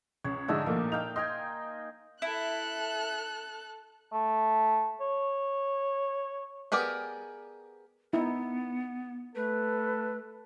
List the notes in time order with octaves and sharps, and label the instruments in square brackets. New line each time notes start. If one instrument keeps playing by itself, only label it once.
[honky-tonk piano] C#2 [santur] C#5
[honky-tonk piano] G#2 D3 G#3 [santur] D4 D#4 E5
[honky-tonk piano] A#1 A#2 A3 [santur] A#3
[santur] D#4 F5 G5 [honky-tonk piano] F7
[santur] D#5 G5 G#5 [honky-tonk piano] C6
[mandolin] E4 [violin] A4 F#6
[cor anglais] A3
C#5
[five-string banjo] B3 G4 G#4 A#4 D5
[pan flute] B3 [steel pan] D#4 E4
[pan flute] A3 [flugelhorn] A4 [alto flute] B4